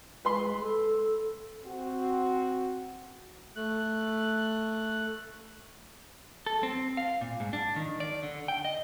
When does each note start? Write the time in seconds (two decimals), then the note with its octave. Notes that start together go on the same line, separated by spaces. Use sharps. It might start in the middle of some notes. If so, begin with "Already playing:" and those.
0.25 G#3 B4 B5 C6
0.61 A4
1.65 C4 F#4
3.56 A3 F#6
6.46 A4
6.63 C4
6.97 F5
7.21 A#2
7.40 G#2
7.53 D4
7.76 D#3
8.00 D5
8.23 D3
8.48 G5
8.65 D#5